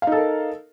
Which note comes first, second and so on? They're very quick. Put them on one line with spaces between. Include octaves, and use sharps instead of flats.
F5 D#4 A4 A#4